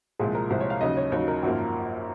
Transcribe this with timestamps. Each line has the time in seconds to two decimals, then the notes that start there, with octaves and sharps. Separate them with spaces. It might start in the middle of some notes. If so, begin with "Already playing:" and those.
0.19 C2 A#2 F3 G#3 G#4
0.35 A#4
0.50 C2 A#2 F3 G#3 C5
0.61 C#5
0.70 F5
0.81 D#2 C#3 F#3 D#5
0.97 C#5
1.12 D#2 C#3 F#3 C#5
1.28 A#4
1.42 G#1 F#2 F3 A#3